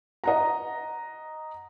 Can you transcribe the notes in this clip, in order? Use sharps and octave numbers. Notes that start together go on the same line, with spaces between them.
D#5 F#5 A#5